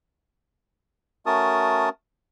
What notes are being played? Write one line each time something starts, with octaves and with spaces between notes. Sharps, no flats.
A3 C#4 F#4 A#4 A5 D#6